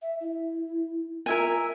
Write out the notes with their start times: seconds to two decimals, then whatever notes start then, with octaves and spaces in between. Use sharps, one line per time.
0.02 E5
0.21 E4
1.26 F4 A#4 E5 G#5